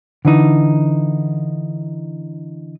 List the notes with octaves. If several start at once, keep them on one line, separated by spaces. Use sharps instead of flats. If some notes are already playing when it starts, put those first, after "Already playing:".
D3 E3 D#4